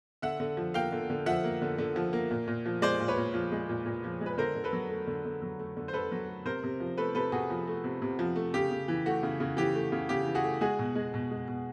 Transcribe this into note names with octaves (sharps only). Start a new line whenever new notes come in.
D3 E5 F#5
D3
F3
A#3 F5 G5
D3
D3
F3 E5 F#5
A#3
D3
D3
F3
A#3
A#2
A#2
F3
G#3 C5 D5
A#2
B4 C#5
A#2
F3
G#3
A#2
A#2
F3
G#3
B4
D3 A#4 C5
D3
A4 B4
F#3
A3
D3
D3
F#3
A3
D3
C5
D3 A4 B4
F#3
A3
C3 A#4 C5
C3
F3
A3 A4 B4
C3 A4 B4
C3 F#4 G#4
F3
A3
C3
C3
F3
A3
C#3 G4
C#3
E3
A3 F#4
C#3
C#3
E3 G4
A3
C#3
C#3 G4
E3
F#4 G#4
A3
G#3 F#4 G#4
B2
G#3
B2
G#3
B2